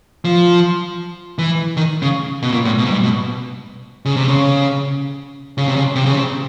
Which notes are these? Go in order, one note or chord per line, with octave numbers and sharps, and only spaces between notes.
F3
E3
D#3
C#3
B2
A#2
A2
B2
G#2
G2
B2
C#3
C3
C#3
C#3
C3
C#3
C3
C#3
C3